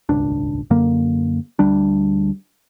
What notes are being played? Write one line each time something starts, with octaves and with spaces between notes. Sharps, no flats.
D#1 G#1 C#2 D4
F#2 D3 A#3
D2 G3 D4